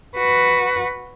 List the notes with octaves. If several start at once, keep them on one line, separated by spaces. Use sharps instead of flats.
F#4 B4